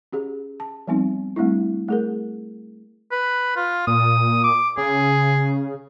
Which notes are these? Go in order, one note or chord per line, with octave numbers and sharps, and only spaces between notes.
C#4 G4 G#4
A5
F3 G3 B3 C4 D#4
G3 A3 C4 D4 E4
A3 G#4 A#4
B4
F4
A#2 D#6
D6
C#3 G#4